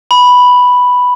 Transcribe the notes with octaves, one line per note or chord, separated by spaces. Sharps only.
B5